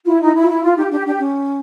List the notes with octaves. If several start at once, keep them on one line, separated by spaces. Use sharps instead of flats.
E4 F4
D#4 E4
E4
F4
E4
E4 F4
D#4 G4
D4 G4
D4 G4
C#4